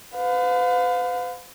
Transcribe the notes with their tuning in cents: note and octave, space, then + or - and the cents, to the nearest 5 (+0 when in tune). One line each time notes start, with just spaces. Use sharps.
B4 +40 F5 +35